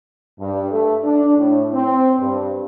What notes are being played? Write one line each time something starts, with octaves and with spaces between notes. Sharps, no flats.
G2
A3
D4
A2
C4
G2